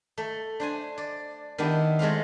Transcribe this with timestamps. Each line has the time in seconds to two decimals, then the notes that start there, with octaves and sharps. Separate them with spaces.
0.18 A3
0.60 D4 C5 G#5
0.98 D5
1.58 D#3 B3 D4 E4 G4
1.99 G#3 A3 C4 F5